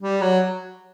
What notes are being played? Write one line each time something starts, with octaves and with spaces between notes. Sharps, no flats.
G3
F#3